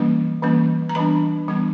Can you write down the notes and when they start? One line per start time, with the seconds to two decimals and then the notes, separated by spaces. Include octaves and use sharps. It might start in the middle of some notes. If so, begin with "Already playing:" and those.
Already playing: E3 G3 A#3 C#4
0.43 E3 G3 A#3 C#4
0.89 A#5
0.95 E3 G3 B3 D4 B5
1.48 E3 G3 B3 D4